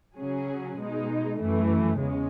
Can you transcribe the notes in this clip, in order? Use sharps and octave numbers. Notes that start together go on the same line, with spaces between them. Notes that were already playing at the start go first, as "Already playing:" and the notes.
C#3 F#3 C#4 G#4
B2 G#3 D#4
F#2 E3 A3
E2 C#3 G#3 C#4